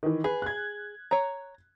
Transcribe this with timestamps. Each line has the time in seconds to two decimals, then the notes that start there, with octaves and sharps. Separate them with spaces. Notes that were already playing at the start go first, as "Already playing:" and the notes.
0.03 D#3 E3
0.24 G#4 B4
0.42 F#6 G#6
1.11 C#5 A#5